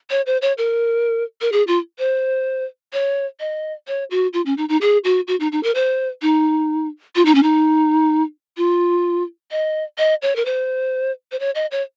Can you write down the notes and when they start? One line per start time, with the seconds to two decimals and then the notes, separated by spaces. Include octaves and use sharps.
0.10 C#5
0.26 C5
0.42 C#5
0.58 A#4
1.41 A#4
1.52 G#4
1.67 F4
1.99 C5
2.93 C#5
3.40 D#5
3.87 C#5
4.11 F#4
4.33 F4
4.46 C#4
4.57 D#4
4.69 D#4
4.81 G#4
5.04 F#4
5.28 F#4
5.40 D#4
5.52 D#4
5.63 A#4
5.75 C5
6.22 D#4
7.16 F4
7.25 D#4
7.35 C#4
7.43 D#4
8.57 F4
9.51 D#5
9.98 D#5
10.22 C#5
10.36 A#4
10.45 C5
11.32 C5
11.40 C#5
11.55 D#5
11.71 C#5